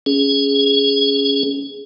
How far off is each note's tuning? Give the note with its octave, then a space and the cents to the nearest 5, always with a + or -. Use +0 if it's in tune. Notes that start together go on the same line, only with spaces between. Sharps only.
C#4 +10 G#4 +0